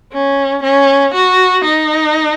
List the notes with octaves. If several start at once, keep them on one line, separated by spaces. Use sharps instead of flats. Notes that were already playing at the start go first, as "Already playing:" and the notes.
C#4
C#4
F#4
D#4